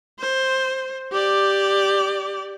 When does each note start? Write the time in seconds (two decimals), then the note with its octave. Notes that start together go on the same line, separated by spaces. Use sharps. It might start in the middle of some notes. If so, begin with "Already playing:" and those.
0.19 C5
1.11 G4 D5